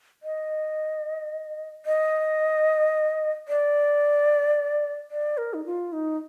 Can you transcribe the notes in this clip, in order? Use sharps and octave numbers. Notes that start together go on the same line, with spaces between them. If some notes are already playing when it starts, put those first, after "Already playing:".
D#5
D#5
D5
D5
A#4
D#4
F4
D#4